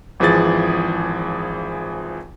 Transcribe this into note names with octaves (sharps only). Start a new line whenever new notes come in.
G#1 E3 F3 G#4 A6